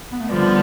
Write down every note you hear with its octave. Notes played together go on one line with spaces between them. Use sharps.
B3
A3
D3 F3 G3 B3